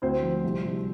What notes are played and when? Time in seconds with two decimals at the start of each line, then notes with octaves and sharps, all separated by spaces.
0.02 D2 C4 C5
0.23 F3
0.44 C2
0.65 C2